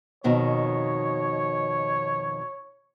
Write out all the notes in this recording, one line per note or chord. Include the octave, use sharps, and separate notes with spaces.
F2 B2 D#3 C#5